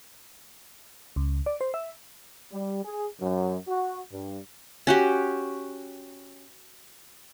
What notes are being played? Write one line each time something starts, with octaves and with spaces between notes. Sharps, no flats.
C#2
D5
C5
E5
G3
G#4
F#2
F#4
G2
C#4 F#4 G4